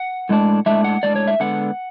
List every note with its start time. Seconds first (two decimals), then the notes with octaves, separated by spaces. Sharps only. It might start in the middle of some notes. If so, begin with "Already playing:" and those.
Already playing: F#5
0.29 A2 G#3 D4
0.66 A2 G#3 D4 E5
0.84 F#5
1.03 A2 G#3 D4 D5
1.16 C#5
1.27 E5
1.40 D3 G#3 B3 F#5